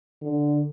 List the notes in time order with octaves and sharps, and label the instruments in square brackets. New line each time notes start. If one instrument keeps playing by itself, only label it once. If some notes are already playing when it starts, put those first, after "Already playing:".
[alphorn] D3